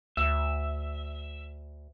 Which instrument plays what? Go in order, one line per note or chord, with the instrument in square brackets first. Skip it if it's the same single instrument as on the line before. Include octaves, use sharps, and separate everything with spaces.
[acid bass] D2 [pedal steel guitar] E5